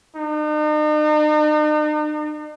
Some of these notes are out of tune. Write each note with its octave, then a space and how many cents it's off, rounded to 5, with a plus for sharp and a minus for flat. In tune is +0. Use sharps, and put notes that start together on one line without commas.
D#4 -45